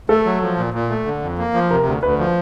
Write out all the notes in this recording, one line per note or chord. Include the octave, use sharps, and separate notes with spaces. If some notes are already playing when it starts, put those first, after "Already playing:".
A3 A4
F#3
F3
A#2
A#2
A3
D3
F2
A#3
F3
C3 A#4
D2
D2 B4
F3